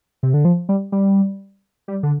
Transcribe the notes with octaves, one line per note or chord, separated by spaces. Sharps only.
C3
D3
F3
G3
G3
G3
D3